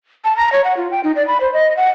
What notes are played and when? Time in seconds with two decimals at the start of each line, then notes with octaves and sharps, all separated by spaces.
0.25 A5
0.37 A#5
0.52 C#5
0.64 F#5
0.77 F4
0.91 G5
1.04 D#4
1.16 D5
1.27 B5
1.41 C5
1.53 D#5
1.77 F#5